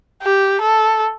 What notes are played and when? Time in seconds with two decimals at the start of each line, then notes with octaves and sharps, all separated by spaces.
0.22 G4
0.61 A4